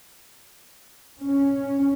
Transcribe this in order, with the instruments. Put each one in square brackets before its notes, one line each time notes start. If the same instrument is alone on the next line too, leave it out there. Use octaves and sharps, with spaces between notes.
[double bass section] C#4